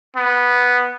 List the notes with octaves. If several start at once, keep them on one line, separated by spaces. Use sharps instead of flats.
B3